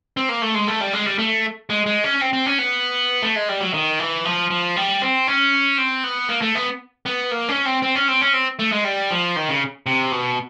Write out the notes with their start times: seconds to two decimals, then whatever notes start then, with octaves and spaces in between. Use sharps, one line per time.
0.17 C4
0.29 A#3
0.42 A3
0.55 G#3
0.68 A3
0.81 G3
0.93 G#3
1.06 G3
1.18 A3
1.70 G#3
1.86 G#3
2.04 C#4
2.21 C4
2.33 C4
2.46 C#4
2.58 B3
3.23 A3
3.36 G#3
3.49 G3
3.61 F#3
3.74 D#3
3.99 E3
4.25 F3
4.50 F3
4.76 G3
5.02 C4
5.27 C#4
5.78 C4
6.04 B3
6.29 A#3
6.42 A3
6.55 B3
7.06 B3
7.31 A#3
7.49 C#4
7.65 C4
7.82 C4
7.95 C#4
8.08 C4
8.21 C#4
8.33 C4
8.59 A3
8.72 G#3
8.84 G3
9.11 F3
9.36 D#3
9.49 C#3
9.86 C3
10.12 B2